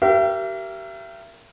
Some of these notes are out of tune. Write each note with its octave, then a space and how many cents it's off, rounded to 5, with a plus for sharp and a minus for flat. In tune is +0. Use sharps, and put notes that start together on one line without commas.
G4 -30 A#4 -5 E5 +35